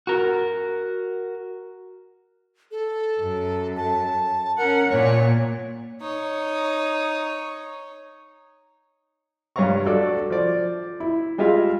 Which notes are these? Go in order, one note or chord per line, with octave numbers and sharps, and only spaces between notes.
F#4 A#4
A4
F#2
A5
C#4 A#4 F#5
A#2 C#5
D#4 C#5
G2 C#5 F5 A#5 C#6
D4 F#4 A4 D5
F3 D5
E4
G3 G#3 F4 E5 F5